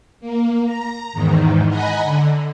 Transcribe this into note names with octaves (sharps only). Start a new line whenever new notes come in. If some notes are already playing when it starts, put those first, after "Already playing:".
A#3
A#5
E2 G#2 D#3
D#5 F#5 G#5 A#5 B5
D3